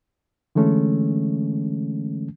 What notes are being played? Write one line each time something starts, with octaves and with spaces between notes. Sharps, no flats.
D3 E3 G#3 A3 C#4